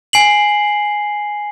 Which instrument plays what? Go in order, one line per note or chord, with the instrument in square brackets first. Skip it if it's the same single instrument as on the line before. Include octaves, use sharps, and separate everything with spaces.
[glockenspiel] G#5 C7 F#7